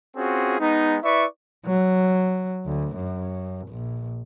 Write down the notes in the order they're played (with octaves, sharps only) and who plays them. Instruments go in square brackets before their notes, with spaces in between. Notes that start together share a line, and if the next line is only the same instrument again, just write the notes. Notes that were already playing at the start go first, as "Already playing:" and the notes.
[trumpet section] C4 C#4 F4 F#4 G#4
G#3 B3 D#4
E4 B4 D5 E5 C#6
[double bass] F#3
D2
F#2
A#1